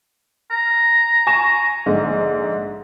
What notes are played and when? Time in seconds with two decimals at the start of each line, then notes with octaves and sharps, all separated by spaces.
0.51 A#5
1.27 G#5 C#6 E7
1.86 A#1 G#2 D3